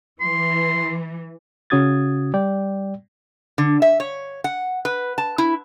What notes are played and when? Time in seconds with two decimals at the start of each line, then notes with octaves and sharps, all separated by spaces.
0.21 E3 C6
1.70 C#3 C#4 F#4 D#6 G#6 A6
2.34 G3 D5 G5
3.58 D3
3.82 E5
4.00 C#5
4.44 F#5
4.85 B4
5.18 A5
5.38 E4